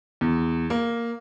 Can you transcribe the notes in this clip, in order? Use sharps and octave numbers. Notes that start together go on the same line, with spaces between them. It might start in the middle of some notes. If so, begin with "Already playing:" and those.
E2
A#3